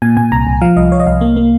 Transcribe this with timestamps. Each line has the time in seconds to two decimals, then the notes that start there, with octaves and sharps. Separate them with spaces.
0.02 A#2 G#5
0.17 A#2 G#5
0.32 C2 A#5
0.47 C2
0.61 F3 F5
0.77 C2 D#5
0.92 C2 C#5
1.00 D#5
1.06 C2 F5
1.21 A#3
1.36 A#3